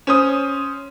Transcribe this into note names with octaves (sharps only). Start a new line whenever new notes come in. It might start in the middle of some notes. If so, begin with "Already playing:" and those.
C#4 C5 D#6